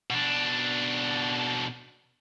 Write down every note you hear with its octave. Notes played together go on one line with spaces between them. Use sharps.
B2 D4